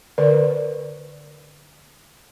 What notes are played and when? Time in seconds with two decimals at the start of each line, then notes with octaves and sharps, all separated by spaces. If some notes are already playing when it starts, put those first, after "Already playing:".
0.18 D3 A#4 B4 D5